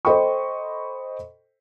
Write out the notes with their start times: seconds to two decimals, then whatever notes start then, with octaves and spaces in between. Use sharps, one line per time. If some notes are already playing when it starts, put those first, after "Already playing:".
0.05 A4 C5 D#5 G5 B5 C#6